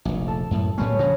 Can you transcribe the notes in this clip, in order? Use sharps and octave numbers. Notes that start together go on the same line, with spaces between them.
F1 A#1 A#5
A4
F#2 A2
A2 G3 A#3 C#4 B4 C#5
C#3 F3 F#5 A#5